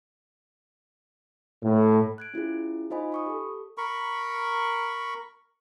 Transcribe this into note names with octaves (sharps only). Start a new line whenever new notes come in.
A2
F#6 G#6 D7
C#4 E4 F4 G#4
D#4 F4 C5 D#5 G#5 B5
B5 C#6 D#6
G4 A4
A#4 B5 C#6